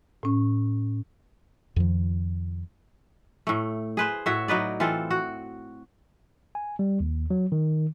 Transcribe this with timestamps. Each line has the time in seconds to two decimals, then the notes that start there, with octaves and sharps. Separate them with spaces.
0.23 A2 C#4
1.76 F2 D#3 F3
3.47 A2 A3
3.97 G#4 B4 C5
4.26 A2 F#4 C#5 E5
4.48 F#3 D#4 B4 D5
4.80 E3 C4 F4 A4
5.11 F#4
6.55 G#5
6.79 G3
7.00 D#2
7.30 F#3
7.52 D#3